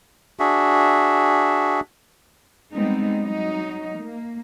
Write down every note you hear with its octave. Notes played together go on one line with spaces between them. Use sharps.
D4 F#4 G#4 E5
G3 G#3 B3 C4 D#4
F#3 D#4
A#3